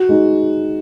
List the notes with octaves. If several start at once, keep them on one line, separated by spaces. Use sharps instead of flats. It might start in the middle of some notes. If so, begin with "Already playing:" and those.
Already playing: F#4
G#3 D#4